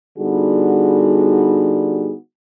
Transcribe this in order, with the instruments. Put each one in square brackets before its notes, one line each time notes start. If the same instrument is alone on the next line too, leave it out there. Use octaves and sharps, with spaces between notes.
[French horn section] D3 G3 B3 D#4 F#4 G#4